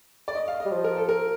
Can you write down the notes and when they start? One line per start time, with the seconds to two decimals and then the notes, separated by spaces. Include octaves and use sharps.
0.28 D5
0.35 D#5
0.48 F5
0.60 D#5
0.65 G3
0.72 F3
0.84 A#4
0.96 A4
1.09 A#4